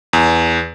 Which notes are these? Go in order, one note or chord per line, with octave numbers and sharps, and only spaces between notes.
E2